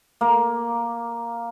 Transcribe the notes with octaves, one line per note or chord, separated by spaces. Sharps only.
A#3